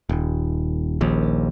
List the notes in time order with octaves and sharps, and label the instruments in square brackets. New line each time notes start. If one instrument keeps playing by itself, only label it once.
[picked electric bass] D#1
D#1 A#1 D#2